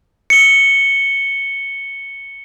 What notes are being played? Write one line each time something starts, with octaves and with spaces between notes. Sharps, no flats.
C#7 G7